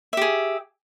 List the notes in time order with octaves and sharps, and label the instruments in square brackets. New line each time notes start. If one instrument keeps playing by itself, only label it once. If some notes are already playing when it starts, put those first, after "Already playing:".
[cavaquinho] E5
G4
G#4